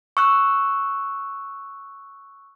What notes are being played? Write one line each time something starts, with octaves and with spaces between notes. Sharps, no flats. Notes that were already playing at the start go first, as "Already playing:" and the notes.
C#6 E6 F#6